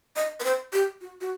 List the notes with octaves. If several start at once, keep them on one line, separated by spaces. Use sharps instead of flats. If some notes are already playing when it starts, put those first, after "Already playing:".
D#5
B4
C5
G4
F#4
F#4